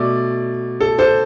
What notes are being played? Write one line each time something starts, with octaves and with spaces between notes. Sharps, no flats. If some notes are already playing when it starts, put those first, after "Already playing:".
Already playing: B2 A3 D5
A4
A4 C5